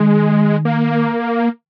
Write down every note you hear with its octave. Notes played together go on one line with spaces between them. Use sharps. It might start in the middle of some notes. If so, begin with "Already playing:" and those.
Already playing: D#3 G#3
A#3